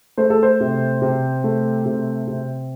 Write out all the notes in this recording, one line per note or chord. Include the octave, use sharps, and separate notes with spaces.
A3 C5
A4
C5
C3
C3
A3
C3
C3